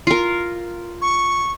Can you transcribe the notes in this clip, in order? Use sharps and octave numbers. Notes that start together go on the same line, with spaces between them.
F4 A#4
C#6